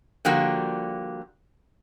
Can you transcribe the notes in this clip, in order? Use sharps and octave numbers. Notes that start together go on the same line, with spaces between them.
D3 F3 G3 A#3 F#4